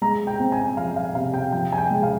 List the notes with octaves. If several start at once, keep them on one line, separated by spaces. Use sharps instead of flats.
G#3 A#5
G5
C4
G#5
F3 F5
F5
C3 F5
G5
F3 G5
G#5
G5
G#3
F5